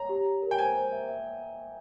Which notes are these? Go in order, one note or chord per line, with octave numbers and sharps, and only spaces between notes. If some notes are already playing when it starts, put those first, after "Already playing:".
Already playing: C#5 A#5
G4
G4
A#4
G5
C5 G#5
C5
E5
E5